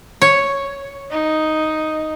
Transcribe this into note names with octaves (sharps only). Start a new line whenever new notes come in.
C#5
D#4